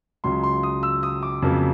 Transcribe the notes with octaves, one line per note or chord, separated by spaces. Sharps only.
C#2 C#3 F#3 C6
C6
D#6
E6
D#6
D6
F2 C#3 F#3 A#3